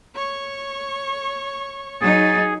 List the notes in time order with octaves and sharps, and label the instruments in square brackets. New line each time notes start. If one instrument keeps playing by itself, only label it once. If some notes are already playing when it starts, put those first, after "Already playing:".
[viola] C#5 C#6
[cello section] F#3 D#4 [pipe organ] G#4 [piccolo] A6